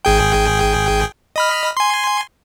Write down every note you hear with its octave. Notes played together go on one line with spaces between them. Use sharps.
G#1 G#4 G5
D#5 B5 F6
G#5 C6